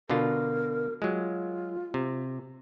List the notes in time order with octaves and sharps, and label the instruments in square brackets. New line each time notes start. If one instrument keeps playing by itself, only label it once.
[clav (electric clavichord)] B2 D3 F4 [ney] A#4
[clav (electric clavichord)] F#3 G#3 [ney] F4
[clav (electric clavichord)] C3